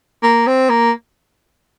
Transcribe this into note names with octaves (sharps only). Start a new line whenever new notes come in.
A#3
C4
A#3